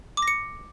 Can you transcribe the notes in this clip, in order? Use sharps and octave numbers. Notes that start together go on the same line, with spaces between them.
D6
A#6
C#7